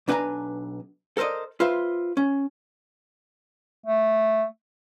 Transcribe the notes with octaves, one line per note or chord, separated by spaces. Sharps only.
B1 D4 B4 F#5 G#5 A#5
A4 A#4 C5 D5 D#5
F4 B4 C5 E5
C#4
A3